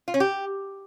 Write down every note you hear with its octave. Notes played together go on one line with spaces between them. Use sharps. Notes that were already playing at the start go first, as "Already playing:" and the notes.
F4
C#4
G4